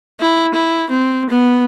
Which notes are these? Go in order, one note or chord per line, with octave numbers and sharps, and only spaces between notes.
E4
E4
C4
B3